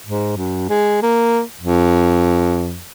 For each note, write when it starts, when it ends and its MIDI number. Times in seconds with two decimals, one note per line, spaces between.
0.06 0.32 44
0.37 0.67 42
0.70 1.01 56
1.03 1.41 58
1.61 2.81 41